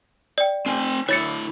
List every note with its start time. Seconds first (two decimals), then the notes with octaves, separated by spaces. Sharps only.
0.38 D5 G5
0.66 C4 G#5
1.09 D3 E4 C#5 A6 C#7